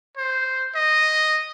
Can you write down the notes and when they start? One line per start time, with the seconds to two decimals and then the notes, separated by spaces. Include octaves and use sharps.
0.17 C5
0.75 D#5